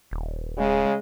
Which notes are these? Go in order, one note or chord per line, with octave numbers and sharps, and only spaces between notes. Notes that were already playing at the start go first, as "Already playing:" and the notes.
D#1
C#3 G#3